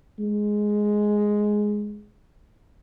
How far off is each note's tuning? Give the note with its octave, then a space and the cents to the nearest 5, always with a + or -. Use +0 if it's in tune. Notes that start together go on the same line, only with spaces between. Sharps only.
G#3 +5